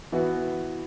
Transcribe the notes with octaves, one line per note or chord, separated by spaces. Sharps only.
E3 B3 F#4 B4